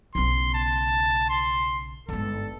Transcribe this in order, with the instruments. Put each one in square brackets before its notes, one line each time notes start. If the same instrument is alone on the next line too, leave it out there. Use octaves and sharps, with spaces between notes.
[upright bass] B1 C#3 [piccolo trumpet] C6
[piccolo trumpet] A5
C6
[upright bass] G1 G#2 [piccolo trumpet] A4